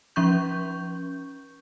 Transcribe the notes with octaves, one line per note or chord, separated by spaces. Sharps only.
F3 C#4 C#6 G6